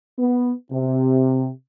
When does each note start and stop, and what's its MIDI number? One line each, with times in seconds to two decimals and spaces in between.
0.19 0.52 59
0.72 1.50 48